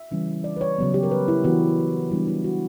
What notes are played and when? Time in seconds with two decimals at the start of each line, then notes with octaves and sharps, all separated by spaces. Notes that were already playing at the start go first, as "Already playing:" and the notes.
Already playing: E5
0.11 C#3 E3 G3 C#4
0.44 D5
0.57 B4
0.61 C#5
0.79 C#3 F#3 B3
0.94 G4
1.03 A#4
1.11 B4
1.28 E4
1.44 E3 B3 E4 F#4
2.11 E3 G3 B3 D4
2.27 E4
2.44 F#4